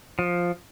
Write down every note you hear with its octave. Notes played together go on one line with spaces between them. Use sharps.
F3